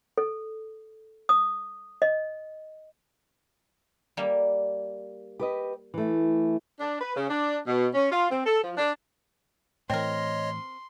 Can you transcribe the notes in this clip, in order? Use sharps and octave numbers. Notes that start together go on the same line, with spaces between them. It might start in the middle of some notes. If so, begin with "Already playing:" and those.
A4
D#6
D#5
G3 A#3
G4 B4 D#5
E3 A3
D4
B4
C#3
D4
B2
C#4
F4
C4
A4
F3
D4
A2 E3 C4 A#4 C#5 D#5 C6